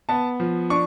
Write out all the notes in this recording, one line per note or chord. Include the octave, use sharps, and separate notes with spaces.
B3 A5
F3
D4 C#6